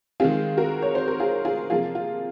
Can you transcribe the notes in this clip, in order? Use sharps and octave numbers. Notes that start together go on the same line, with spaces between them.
D#3 G#3 C4 F4 G#4
F#4 A#4
C#5
C5
A#4
F4 G#4
F4 G#4
C3 F3 A#3 F4 G#4
F4